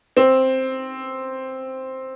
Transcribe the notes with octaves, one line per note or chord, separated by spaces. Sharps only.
C4